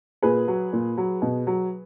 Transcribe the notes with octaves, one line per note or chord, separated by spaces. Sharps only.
A#2 G#4 B4
F#3
A#2
F#3
B2
F#3